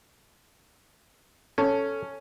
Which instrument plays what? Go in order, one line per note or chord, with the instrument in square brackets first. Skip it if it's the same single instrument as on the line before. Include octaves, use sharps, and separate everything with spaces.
[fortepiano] C#4 [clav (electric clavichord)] A4